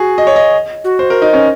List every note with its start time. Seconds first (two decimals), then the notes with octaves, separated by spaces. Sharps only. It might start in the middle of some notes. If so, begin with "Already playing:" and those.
Already playing: F#4 G#4
0.18 D#5
0.27 C#5
0.36 D#5
0.84 F#4
0.99 C5
1.10 A#4
1.22 D#4
1.33 C#4